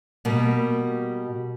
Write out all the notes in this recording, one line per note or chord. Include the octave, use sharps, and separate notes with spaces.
B2 G3 A#3